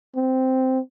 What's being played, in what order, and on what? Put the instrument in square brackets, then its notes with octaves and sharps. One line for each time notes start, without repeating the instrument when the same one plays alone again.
[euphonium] C4